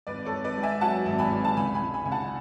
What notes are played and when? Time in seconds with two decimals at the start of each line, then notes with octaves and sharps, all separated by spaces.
0.07 G#1 B4 D5
0.25 A4 C#5
0.32 G#1
0.44 B4 D5
0.57 G#2
0.63 E5 G#5
0.81 F#3 F#5 A5
1.06 G#1
1.18 G#5 B5
1.32 G#1
1.45 A5
1.57 C#2 G#5 B5
1.74 G#5 B5
1.82 C#2
1.94 G#5 B5
2.05 C#2 G#5
2.12 F#5 A5